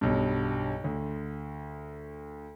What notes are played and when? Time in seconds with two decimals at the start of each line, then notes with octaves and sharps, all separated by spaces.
0.01 B1 G2
0.84 D2